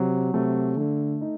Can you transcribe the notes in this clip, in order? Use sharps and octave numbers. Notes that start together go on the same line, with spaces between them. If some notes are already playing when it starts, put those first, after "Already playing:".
Already playing: C3 F#3
C3 A3
D3 A3
D#4